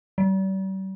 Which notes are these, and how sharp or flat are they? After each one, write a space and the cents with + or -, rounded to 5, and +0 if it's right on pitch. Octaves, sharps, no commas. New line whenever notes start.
G3 -40